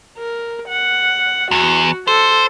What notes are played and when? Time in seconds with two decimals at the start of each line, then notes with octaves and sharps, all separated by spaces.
0.18 A#4
0.68 F#5
1.51 E2 F#4
2.07 A4 C5